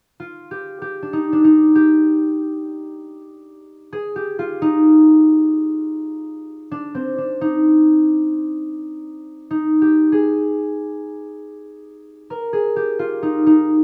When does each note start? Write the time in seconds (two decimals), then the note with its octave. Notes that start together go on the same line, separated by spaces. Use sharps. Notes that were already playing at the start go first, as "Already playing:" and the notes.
0.20 F4
0.51 G4
0.82 G4
1.02 D4
1.13 D#4
1.33 D4
1.44 D#4
1.75 G4
3.93 G#4
4.16 G4
4.39 F4
4.62 D#4
6.71 D4
6.95 C4
7.18 D4
7.41 D#4
9.51 D#4
9.82 G4
10.12 G#4
12.30 A#4
12.53 G#4
12.76 G4
12.99 F4
13.23 D#4
13.46 D#4